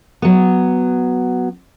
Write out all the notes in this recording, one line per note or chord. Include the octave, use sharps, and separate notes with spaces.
F#3 B3